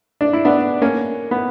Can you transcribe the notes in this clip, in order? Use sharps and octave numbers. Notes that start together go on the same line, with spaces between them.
D4
E4
B3 D4
A#3 C#4
B3